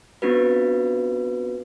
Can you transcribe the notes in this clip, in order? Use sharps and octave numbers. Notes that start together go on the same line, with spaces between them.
B3 C4 D4 F4 F#4 B4